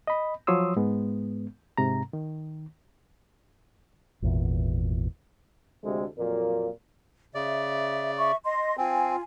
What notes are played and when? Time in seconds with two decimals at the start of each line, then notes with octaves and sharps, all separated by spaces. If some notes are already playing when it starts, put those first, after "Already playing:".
0.07 D#5 B5
0.47 F3 F#3 C#5 C6 D#6 E6
0.76 G#2 G#3 B3
1.78 G#2 C3 A#5
2.13 D#3
4.22 G#1 E2 A#2 E3
5.83 D2 C3 G#3 A4
6.17 F2 A#2 F#3 A#3
7.35 C#3 D5 E5
8.18 E5 C#6
8.44 D#5 C6
8.77 C4 F4 G#5